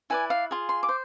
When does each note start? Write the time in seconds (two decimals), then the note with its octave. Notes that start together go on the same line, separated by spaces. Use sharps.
0.10 E4 B4 D5 G#5
0.30 F5
0.51 F4 G#4
0.69 C6
0.83 D6
0.89 C5